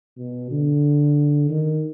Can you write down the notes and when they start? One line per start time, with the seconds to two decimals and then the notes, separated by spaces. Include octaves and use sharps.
0.18 B2
0.51 D3
1.49 D#3